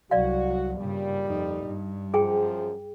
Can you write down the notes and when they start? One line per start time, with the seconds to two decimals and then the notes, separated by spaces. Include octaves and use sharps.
0.11 C2 F#3 F#4 D5 F5
0.78 G2 A#2 C#3 G3
1.26 F2 D#4
1.64 G2
2.14 F#2 F3 G#4 G5